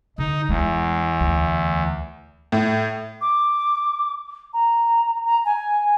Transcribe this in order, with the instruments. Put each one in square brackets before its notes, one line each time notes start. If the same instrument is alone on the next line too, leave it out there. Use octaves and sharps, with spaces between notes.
[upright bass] D3 [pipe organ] D#4
[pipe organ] E2 [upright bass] G#3 E4
[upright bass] D2
[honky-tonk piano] A2
[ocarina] D6
A#5
A#5
G#5